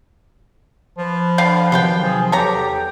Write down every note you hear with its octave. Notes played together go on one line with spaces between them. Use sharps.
F3 B4
D3 F5 G5
C3 D#3 F#3 C5 F5 G5
F3 G#4
E2 B3 G4 A4 C#5 A#5